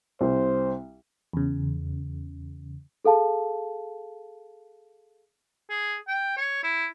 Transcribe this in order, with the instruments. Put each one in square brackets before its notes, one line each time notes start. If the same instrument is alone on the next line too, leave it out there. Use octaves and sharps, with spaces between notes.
[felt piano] C2 [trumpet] C5
[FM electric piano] E2 C#3
[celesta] G#4 A4 F5 A5
[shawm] G#4
G5
C#5
E4